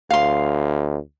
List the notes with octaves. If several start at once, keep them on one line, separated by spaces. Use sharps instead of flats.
D2 F5 C6